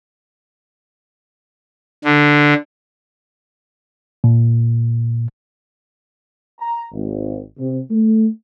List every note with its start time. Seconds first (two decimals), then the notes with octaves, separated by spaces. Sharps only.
2.04 D3
4.24 A#2
6.60 A#5
6.92 G#1
7.58 C3
7.90 A3